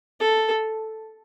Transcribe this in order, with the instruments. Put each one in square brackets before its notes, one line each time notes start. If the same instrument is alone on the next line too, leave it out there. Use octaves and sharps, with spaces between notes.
[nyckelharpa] A4